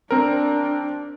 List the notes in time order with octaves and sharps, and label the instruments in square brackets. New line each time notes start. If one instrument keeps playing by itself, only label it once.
[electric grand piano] C4 A#4 [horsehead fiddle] D4